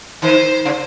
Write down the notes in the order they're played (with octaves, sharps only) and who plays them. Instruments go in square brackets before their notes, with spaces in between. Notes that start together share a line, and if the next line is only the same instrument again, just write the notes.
[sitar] D#3 [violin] C5
[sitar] C#3